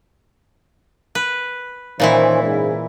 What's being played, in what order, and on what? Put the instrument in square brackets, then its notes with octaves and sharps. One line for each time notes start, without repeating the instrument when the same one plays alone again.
[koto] B4
[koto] A#2 E3 E4 [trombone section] D#3 C#4 C5
[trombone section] G#2 C#3